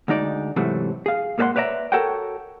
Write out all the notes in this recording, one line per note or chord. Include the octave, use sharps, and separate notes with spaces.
D2 G#3 D#4 D5
G#2 C3 E3 F#3 A3
G#4 F5
G#2 A#3 A4 D5 F#5 C6
B4 C#5 D5 E5 A#5
F#4 A4 A#4 C#5 F#5 G5